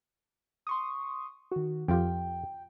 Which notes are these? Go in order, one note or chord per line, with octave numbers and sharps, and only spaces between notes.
C6 C#6 D#6
D#3 F#4
F2 F4 G4 G5